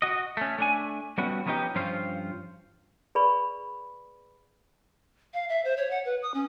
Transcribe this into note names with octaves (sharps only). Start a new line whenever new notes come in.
F#4 D#5
A3 C#4
A3 D4 G#5
G3 A3 B3 C#4 F#4
F3 F#3 B3 C#4 D#4 G4
G2 F3 C#4 F4 C5
G#4 B4 D5 B5 C#6
F5
E5
C5
C#5
F#5
B4
D#6
C#4